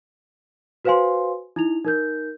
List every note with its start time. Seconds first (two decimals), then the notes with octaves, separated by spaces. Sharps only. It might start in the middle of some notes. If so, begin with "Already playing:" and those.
0.85 F#4 B4 C5 F5 G#5 C6
1.56 D#4 E4 F7
1.84 D#4 A#4 G6